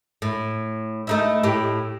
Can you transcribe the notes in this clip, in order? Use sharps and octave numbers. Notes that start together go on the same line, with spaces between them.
A2
A3 D#4 E4
A2 G4